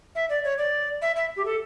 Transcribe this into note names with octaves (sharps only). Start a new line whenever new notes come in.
E5
D5
C#5
D5
E5
E5
G4
A4